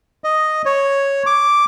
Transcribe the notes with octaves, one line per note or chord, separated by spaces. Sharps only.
D#5
C#5
D6